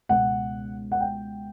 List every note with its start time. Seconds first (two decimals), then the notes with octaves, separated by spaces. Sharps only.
0.09 C#2 B2 F#5
0.92 F#5
1.00 G5